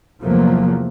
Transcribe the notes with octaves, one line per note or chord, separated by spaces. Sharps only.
E2 C3 F3 F#3 A3 A#3